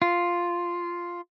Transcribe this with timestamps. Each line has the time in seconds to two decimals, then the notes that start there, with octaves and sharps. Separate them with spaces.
0.02 F4